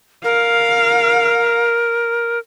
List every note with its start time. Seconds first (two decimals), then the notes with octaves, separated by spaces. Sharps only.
0.24 A#4 F5